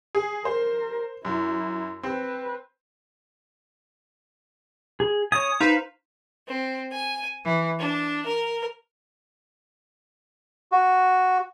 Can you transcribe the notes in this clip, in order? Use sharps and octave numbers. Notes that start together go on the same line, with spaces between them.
G#4
A#4 C5
F#2 E4
C4 B4
G#4
C#5 G#5 D#6
D#4 B4 C5 F5
C4
G#5
E3
D4
A#4
F#4